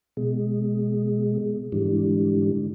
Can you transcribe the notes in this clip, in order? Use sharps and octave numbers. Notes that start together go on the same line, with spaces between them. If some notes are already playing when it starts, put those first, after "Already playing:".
B2 G#3
G#2 D3 E3 G3